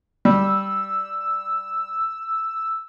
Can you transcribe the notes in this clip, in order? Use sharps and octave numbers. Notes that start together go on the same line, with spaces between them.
G3 E6